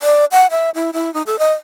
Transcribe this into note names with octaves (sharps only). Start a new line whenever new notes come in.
D5
F#5
E5
E4
E4
D#4
A4
D#5